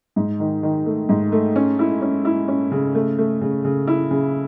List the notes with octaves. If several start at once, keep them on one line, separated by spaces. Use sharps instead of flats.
G#2
D#3
D#3
A3
G#2
A3
C#4
E4
C#4
E4
C#4
C#3
A3
A3
C#3
C#3
E4
C#3